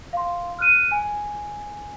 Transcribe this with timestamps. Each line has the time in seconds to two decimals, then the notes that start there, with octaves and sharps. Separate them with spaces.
0.13 F5 C6
0.59 F6 F#6 D#7
0.91 G#5